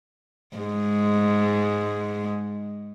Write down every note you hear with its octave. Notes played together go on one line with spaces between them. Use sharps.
G#2 G#3